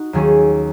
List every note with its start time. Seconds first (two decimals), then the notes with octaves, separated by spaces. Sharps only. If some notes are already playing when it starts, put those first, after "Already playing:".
Already playing: D#4 F#4
0.13 D#2 D#3 F#3 C#4 G#4